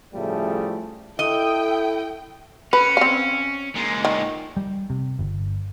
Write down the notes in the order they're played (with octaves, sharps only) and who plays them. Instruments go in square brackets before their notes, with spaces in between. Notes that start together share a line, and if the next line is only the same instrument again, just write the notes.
[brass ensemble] A2 C#3 F3 G3 A3
[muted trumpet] E4 [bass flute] A4 [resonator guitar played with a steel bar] D#5 [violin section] G5
[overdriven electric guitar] C#4 [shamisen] B4
[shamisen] C4 F5
[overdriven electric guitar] A#2 G#3
[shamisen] D#3
[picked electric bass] G3
C3
G1